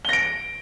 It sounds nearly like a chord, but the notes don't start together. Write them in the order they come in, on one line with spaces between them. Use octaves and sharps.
G7 A#6 D7